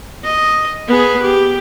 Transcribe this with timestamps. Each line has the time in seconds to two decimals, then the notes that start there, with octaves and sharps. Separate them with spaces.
0.24 D#5
0.87 B3 G#4
1.22 G4